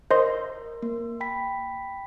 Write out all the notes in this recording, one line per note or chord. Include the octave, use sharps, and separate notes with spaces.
A#4 C5 D#5 C6
A#3
G5 B5 B6